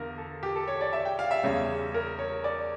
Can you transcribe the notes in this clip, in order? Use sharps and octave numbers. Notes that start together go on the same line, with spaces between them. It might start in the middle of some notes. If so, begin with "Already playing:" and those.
Already playing: E2 D3 A#4 F5
A4
G4
A4
C#5
D5
E5
G5
F5
E5
E2 C#3 G3 C#5
A#4
C#5
D5